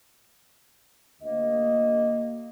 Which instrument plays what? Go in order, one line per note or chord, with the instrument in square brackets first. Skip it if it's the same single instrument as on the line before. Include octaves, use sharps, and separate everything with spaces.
[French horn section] D2 D#5 [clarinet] A#3